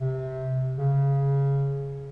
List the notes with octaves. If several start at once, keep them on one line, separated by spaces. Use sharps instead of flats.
C3
C#3